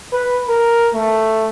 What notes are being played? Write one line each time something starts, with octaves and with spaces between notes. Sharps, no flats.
B4
A#4
A3